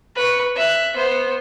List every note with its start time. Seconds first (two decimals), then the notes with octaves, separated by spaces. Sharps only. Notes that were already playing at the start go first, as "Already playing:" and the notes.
0.15 B4 C#6
0.55 E5 F#6
0.96 B3 C5